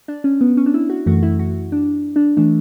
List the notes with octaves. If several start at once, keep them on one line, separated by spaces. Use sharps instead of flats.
D4
C#4
B3
C#4
D4
E4
F#4
F#2 E3 A3 F#4
E4
F#4
D4
D4
E3 A3 D4